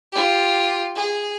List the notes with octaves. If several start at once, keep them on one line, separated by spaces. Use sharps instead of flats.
F4 G4
G#4